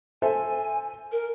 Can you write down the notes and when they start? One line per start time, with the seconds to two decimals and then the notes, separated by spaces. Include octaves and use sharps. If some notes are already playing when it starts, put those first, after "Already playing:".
0.22 A4 C5 E5 G#5
1.12 A#4